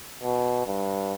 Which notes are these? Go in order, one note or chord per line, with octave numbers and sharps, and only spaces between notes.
B2
G2